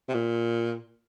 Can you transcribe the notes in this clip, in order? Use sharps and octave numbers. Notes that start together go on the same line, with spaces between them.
C3
A#2